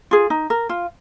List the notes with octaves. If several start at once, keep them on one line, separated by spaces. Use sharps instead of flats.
F4 G#4
D#4
A#4
F4